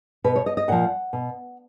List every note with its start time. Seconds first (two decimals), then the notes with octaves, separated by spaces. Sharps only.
0.24 B2 B4
0.36 C#5
0.46 D#5
0.57 D#5
0.68 A#2 F3 F#5
1.13 B2